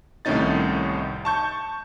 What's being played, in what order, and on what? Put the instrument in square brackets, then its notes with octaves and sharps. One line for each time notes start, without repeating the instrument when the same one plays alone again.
[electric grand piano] C2 A2 D#3 C#4 D#4 A6
A5 C#6 G6